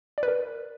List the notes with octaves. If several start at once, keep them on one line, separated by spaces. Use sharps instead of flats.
D5
B4
A#4